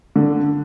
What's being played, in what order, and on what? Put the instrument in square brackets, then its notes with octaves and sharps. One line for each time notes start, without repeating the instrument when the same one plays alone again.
[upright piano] D3